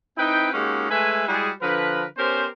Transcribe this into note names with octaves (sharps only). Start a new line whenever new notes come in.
C4 D#4 E4 B4 G5
G#3 A#3 C#4 D#4 F#4 G4
G#3 A3 B4 E5 G#5
G3 G#3 E4 F#4 G#4
D3 F3 A#4 B4
B3 C#4 G4 A#4 C5